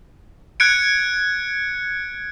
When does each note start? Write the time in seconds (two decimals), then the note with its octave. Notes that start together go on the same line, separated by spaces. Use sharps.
0.60 F#6 G#6 C#7 D7